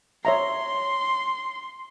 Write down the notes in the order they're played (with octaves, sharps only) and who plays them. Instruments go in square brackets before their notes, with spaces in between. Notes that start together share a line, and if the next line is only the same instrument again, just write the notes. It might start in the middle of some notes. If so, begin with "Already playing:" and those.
[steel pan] C#5 E5 A#5 [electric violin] C6